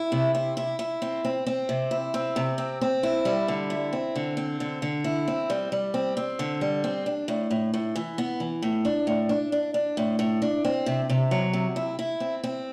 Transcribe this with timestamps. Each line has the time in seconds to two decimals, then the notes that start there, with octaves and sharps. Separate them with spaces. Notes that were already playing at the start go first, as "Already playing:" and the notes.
Already playing: E4
0.12 C3
0.35 E4
0.57 E4
0.79 E4
1.02 C4
1.25 C4
1.47 C4
1.69 C3
1.91 E4
2.14 C4
2.36 C3
2.58 C4
2.81 C4
3.03 E4
3.25 G3
3.48 D3
3.70 E4
3.93 C4
4.16 D3
4.37 C4
4.60 D3
4.82 D3
5.04 E4
5.28 C4
5.50 G3
5.72 G3
5.94 C4
6.17 C4
6.39 D3
6.61 G3
6.84 C4
7.06 D4
7.28 A2
7.51 A2
7.74 A2
7.96 E3
8.18 B3
8.40 E3
8.62 A2
8.85 D4
9.07 A2
9.29 D4
9.52 D4
9.74 D4
9.97 A2
10.19 A2
10.42 D4
10.65 C4
10.86 C3
11.10 C3
11.31 F#3
11.53 C3
11.76 E4
11.99 E4
12.20 C4
12.44 C4